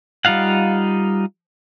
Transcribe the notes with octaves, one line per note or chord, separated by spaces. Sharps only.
G3 D#4 F4 F5 F#5